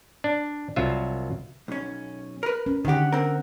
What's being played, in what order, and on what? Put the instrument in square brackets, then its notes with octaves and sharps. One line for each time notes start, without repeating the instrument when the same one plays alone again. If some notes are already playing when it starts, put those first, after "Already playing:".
[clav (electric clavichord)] D4
C2 F#3 F4 E5
[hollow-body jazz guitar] B1 C#4
A#4 B4
[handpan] C#4
[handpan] D3 F#5 [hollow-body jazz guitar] D#3 G4
[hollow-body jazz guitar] C4 A#4